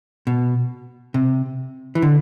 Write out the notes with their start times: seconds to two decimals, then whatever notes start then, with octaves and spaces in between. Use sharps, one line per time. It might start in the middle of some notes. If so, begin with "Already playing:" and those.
0.27 B2
1.14 C3
1.95 E3
2.02 D3